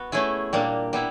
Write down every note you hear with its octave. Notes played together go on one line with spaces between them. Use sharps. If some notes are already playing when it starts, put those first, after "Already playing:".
Already playing: B3 F#4
A3 C#4 E4 G#4
A#2 G3 A#3 D4
G3 B3 E4